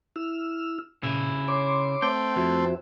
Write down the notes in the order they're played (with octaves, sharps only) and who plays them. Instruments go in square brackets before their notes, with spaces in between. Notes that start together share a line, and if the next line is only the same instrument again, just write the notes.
[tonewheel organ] E4 E6 F6
[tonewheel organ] A#2 [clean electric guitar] C#3 E4
[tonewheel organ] C#5 C6 D6
[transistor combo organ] A3 C4 [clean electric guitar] G5
[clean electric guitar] F2 [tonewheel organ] F#4 C5 E5